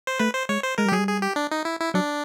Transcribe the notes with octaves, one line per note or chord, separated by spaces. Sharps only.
C5
A3 B4
C5
G#3 C#5
C5
G#3 A#4
G3
G4
F#3 G#4
G3
G#4
G4
D4
D#4
E4
E4
F#3 D4